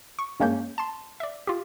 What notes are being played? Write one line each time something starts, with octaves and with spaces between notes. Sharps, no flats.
C#6
G2 G#3 A#3 C#4 G6
A5 C6
D5 E5
F4 G4